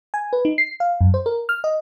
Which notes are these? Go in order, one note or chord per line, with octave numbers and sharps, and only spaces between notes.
G#5
B4
D#4
C7
F5
F#2
C5
A#4
F6
D#5